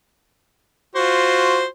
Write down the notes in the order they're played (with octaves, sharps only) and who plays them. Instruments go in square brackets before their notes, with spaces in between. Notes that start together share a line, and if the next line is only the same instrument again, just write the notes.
[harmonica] F4 F#4 C5